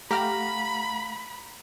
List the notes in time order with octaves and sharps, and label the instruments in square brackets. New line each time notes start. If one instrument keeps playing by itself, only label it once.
[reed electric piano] A3 F5 F#5 [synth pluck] G4 F6 A#6 [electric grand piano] A#5 [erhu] B5